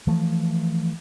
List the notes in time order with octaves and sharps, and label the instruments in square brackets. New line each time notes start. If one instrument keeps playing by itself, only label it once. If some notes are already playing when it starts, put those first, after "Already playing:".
[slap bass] E3 F3 A3